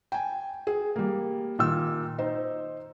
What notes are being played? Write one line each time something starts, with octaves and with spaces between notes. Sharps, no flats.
G5 G#5
G#4
G3 A#3
A#2 D#3 E6
D#4 C5